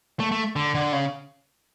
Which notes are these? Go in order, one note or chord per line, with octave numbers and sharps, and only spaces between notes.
A3
A3
D3
D3
C#3